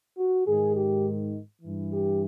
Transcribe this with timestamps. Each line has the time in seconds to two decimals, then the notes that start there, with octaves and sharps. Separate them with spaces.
0.18 F#4
0.47 G#2 D#3 G#4
0.76 G4
1.62 G2 E3
1.92 G4